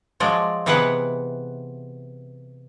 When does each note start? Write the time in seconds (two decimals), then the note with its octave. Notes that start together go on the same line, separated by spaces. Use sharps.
0.20 F3 F#3 G#3 D5
0.66 C3 E3 B3 G#4 B4 F#5